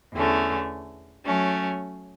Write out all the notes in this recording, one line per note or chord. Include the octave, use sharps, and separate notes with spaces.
E2 D3 A3 C#4
F#3 A3 C#4